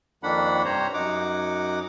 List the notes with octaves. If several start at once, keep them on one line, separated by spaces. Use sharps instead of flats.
F2 D#3 A#3 D4 F#5 B5
G2 C3 C5 C#5 A#5
F#2 D#4 F#5 D6